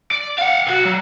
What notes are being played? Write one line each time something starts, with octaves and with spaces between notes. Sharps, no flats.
D5
F5 F#5
B1 F#4
F#3